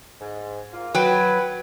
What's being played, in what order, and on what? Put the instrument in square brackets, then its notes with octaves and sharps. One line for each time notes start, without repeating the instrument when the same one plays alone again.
[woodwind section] G#2
A#3 F4
[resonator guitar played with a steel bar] F#3 G5 [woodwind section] B4